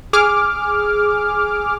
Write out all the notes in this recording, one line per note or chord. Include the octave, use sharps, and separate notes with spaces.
G#4 D6 F6